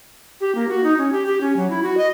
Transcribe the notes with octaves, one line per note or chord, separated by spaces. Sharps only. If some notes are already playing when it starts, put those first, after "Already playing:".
G4
A#3
F#4
D#4
C#4
G4
G4
C#4
F#3
E4
F#4
D#5